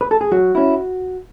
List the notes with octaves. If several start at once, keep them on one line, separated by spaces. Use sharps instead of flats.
B4
A4
G#4
F#3 F#4
C#4 E4